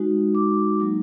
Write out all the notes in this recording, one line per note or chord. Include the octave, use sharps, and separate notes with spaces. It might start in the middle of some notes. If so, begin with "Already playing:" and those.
Already playing: G#3 D#4 F#4
D6
F#3 A#3 D#4